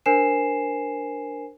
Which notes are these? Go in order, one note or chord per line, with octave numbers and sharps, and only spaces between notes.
D4 A#4 C5 G#5 C7 E7